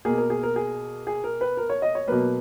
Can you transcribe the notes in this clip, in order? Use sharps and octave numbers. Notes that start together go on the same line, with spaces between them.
B2 A#3 G#4
A#4
G#4
A#4
G#4
G#4
A#4
B4
A#4
C#5
D#5
C#5
B2 F#3 A#3 B4